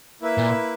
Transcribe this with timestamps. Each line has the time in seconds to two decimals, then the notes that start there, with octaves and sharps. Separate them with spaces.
0.21 A#3 E4 B4 E5
0.38 A#2